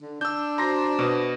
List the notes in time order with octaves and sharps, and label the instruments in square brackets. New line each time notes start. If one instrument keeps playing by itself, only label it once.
[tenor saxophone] D3
[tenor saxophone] D4 [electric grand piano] E6 G6
[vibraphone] F#4 C5 [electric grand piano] A#5 C6 A#6
[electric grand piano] B2 B3